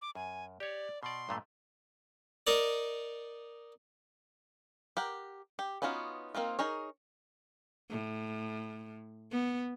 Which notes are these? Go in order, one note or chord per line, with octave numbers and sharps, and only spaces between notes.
D6
F#2 G#5
G4 C#5 D5
B2 D5 C6
G2 A#2 A3
D#4 A#4 D5
G4 A#4 F#5
G4
B3 C#4 D#4 F4 F#4
A#3 C4 D#4 F4
D#4 G#4 A#4 C#5
A2
B3